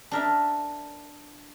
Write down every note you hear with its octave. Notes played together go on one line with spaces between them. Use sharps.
D4 A#4 E5